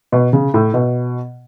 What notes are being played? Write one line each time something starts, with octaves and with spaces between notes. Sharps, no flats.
B2
C#3
A2
B2